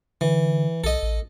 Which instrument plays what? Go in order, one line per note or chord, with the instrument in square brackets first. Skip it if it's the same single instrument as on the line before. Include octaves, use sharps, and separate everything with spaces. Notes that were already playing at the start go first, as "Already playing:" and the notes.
[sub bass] D3 [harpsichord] E3
[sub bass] B1 [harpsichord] A4 D#5
[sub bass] A1